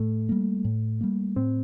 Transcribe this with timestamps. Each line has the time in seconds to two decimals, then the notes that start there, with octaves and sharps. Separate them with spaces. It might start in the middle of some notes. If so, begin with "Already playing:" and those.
Already playing: A2 A3
0.29 G3 A#3
0.65 A2
1.01 G3 A#3
1.36 A2 C4